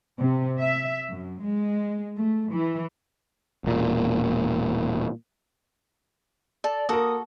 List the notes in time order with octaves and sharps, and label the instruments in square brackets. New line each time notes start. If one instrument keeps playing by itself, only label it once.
[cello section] C3
E5
F#2
G#3
A3
E3
[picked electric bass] E1 A#2
[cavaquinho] A4 [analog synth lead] D5
[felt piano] A#3 A#4 [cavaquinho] F#4 A4 [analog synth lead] D#6